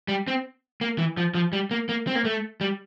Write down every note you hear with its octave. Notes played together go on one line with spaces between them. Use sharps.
G3
C4
A#3
E3
F3
F3
G3
A#3
A#3
C4
A#3
A3
G3